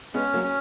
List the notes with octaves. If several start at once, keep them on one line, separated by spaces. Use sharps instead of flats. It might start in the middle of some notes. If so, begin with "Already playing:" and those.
G#3 B3 C#4
F#3 A#3
C#4